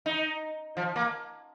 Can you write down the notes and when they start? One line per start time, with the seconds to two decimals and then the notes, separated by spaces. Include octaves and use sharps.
0.06 D#4
0.77 F3
0.96 A#3